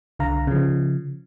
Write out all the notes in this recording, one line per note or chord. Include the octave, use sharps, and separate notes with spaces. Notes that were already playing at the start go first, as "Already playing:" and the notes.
C2 D3 F5 A#5
C#3 F3